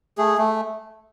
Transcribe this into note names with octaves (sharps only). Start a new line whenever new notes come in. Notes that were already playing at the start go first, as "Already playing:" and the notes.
A3 G#4
A3